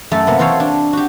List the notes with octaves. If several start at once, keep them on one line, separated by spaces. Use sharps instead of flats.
F#2 A3 A4
C3 A#3 B3
E3 C4 A4 C5 C#5 F5
D4
F#4 G4